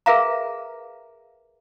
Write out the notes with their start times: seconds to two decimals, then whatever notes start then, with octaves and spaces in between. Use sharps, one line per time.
0.06 G#4 A#4 B4 E5 F5 A#5